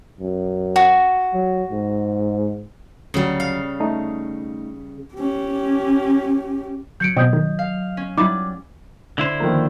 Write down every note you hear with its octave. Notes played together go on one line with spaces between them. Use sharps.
F#2
F#4
F#3
G#2
D2 C#3 F#3 G3
F5
A3 D#4
C#4 G4
F#3 G6 C#7 D7
B2 C4 F#4 D#5 D#6 G6
D#3
F5
C#4
F#3 G3 D#4 E4 D6 A6
D3 E4 C5
D#3 F3 A#3